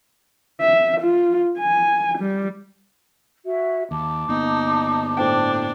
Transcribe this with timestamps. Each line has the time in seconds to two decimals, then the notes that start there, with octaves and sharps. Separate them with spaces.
0.61 E5
1.01 F4
1.59 G#5
2.18 G3
3.45 F#4 E5
3.91 D#2 A5 D6
4.29 G1 A#3 B3 D#4
5.17 A2 D4 C5 G5